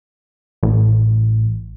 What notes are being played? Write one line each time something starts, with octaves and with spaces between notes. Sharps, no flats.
A1